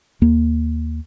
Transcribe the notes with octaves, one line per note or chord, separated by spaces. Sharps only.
D#2 A#3